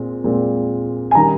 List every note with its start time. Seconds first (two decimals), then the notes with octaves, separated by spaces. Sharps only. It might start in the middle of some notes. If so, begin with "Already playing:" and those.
Already playing: A#2 G#3 C4
0.24 A#2 G#3 C4
1.11 G#5
1.15 D#3 G3 C#4 A#5